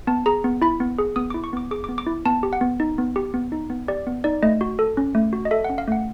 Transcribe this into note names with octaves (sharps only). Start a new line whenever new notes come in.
B3 A5
G#4 A#5
B3
E4 B5
B3
G#4
B3 D#6
E4 D6
C#6
B3 D6
G#4 D6
B3 D6
D6
E4
B3 A5
G4
F#5
B3
D#4
B3
G4
B3
D#4
B3
G4 D5
B3
D#4 D5
A3 D#5
F#4
A4
C#4
A3
F#4
D#5
A4 E5
F#5
C#4
F5
A3 F#5